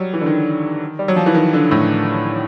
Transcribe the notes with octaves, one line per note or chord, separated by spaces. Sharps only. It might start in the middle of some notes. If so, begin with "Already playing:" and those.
Already playing: F#3 G3
E3
D3
D#3
G3
F#3
F3
E3
D#3
D3
A2